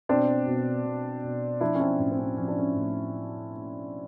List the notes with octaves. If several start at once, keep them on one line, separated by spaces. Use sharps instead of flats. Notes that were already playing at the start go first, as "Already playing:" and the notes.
B2 C4 D4
B2
B2
B2
F3 D4 E4
C#4
C4 D4
A2 C#4
C4
C#4
F3 C#4
D4
C#4
A2